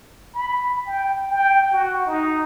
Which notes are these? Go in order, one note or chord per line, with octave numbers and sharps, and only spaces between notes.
B5
G5
G5
F#4
D#4